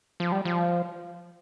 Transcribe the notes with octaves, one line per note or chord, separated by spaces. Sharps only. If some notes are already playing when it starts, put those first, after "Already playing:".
F3
G3
F3